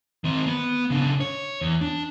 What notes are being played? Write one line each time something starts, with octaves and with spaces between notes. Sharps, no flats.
D#3 C4
B3
C#3 D4
C#5
E2
D4